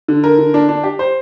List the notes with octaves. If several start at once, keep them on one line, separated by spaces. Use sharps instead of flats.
D3
A#4
D3
D4
D4
G4
C5